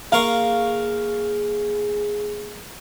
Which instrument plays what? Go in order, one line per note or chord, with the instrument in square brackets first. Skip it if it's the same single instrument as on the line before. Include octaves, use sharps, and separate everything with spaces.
[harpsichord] A#3 A#4 C#6 [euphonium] G#4 [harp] F5